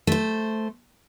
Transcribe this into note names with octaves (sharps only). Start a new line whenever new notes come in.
A3 C5